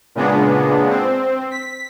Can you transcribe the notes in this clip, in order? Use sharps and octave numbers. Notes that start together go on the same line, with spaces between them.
A#2 C#3 G#3 B3 D4
C4
B6